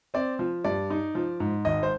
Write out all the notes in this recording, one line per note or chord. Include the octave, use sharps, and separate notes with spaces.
C4 D5
F3
G2 D5
D#4
F3
G#2
G#1 D#5
C5